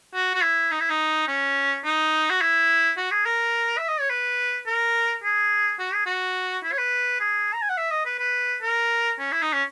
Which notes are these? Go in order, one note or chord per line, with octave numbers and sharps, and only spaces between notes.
F#4
F#4
E4
D#4
E4
D#4
C#4
D#4
F#4
E4
F#4
G#4
A#4
E5
D#5
C#5
B4
A#4
G#4
F#4
G#4
F#4
E4
C#5
B4
G#4
A#5
G#5
F#5
E5
D#5
B4
B4
A#4
C#4
E4
D#4
C#4